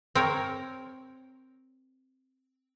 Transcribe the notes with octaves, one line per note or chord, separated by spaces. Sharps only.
C4 A#4 C#5